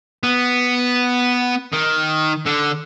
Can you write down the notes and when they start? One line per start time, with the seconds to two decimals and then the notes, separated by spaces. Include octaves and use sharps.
0.23 B3
1.72 D#3
2.46 D3